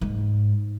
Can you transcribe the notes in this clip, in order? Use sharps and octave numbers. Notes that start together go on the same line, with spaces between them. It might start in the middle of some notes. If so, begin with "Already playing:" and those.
G#2